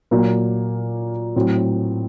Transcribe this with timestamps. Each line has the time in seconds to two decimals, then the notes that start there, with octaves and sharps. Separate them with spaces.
0.11 A#2 F#3 A#3
1.36 A2 F#3 C4